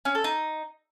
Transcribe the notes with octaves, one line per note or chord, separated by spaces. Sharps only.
C#4
A4
D#4